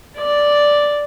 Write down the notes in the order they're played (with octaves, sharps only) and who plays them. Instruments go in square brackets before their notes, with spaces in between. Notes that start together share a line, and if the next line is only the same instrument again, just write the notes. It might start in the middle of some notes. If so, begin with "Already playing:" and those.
[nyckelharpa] D5